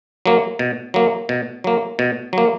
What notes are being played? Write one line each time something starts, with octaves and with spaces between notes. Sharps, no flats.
F#3 A#3
B2
F#3 A#3
B2
F#3 A#3
B2
F#3 A#3